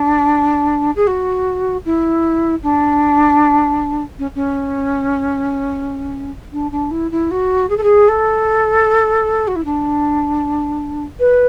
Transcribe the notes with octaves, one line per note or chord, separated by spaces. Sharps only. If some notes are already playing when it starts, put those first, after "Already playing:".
Already playing: D4
G#4
F#4
E4
D4
C#4
C#4
D4
D4
E4
E4
F#4
G#4
A4
G#4
A4
F#4
E4
D4
B4